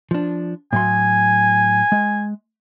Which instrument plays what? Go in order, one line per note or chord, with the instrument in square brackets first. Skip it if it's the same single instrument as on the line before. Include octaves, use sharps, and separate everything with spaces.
[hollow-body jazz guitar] F3 D4
[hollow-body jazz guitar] A2 F#3 C6 [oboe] G#5
[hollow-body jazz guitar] G#3